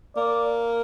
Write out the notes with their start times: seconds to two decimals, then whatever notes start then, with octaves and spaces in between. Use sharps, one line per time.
0.16 A#3 D5